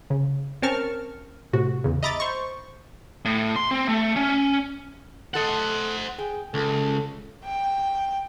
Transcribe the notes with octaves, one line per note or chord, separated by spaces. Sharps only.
C#3
C4 C#4 A#4 A5 C#6 F6
A2 C3 F#4
E2 C#3
D#5 E5 A#5 B5 D6 A6
C5 C#6
A2
C6
C4
A3
C#4
A3 A4 C5 D#5 F#5
G#4 G5
C#2 A4
G5